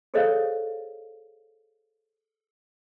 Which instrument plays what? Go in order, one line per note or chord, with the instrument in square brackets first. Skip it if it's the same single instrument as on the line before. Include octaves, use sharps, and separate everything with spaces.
[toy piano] G#4 A4 C5 C#5 D#5 F5